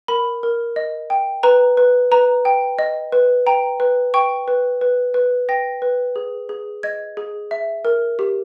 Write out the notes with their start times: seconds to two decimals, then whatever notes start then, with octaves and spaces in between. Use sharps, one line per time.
0.08 A#4 B5
0.43 A#4
0.76 D#5
1.10 G5
1.43 B4 A#5
1.77 B4
2.12 B4 A#5
2.45 G5
2.79 D#5
3.12 B4
3.47 G5 A#5
3.80 B4
4.14 G5 C#6
4.48 B4
4.81 B4
5.14 B4
5.49 G5 A#6
5.82 B4
6.16 G#4
6.49 G#4
6.83 D#5 G#6
7.17 G#4
7.51 E5
7.85 A#4
8.19 G4